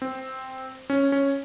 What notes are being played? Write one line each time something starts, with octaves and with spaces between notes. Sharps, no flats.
C4
C#4
C#4